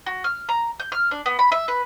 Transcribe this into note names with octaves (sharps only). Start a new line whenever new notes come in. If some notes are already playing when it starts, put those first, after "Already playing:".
F#4
F6
A#5
G6
F6
D4
B3
B5
E5
B4